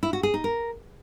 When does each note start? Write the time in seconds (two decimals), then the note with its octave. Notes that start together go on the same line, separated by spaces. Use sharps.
0.03 E4
0.13 F#4
0.23 G#4
0.34 D#4
0.44 A#4